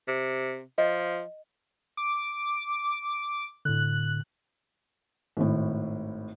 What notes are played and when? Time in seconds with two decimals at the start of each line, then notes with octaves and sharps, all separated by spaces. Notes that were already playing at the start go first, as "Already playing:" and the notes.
0.08 C3
0.78 F3 D#5
1.97 D6
3.65 A2 D3 F#6
5.37 G#1 A2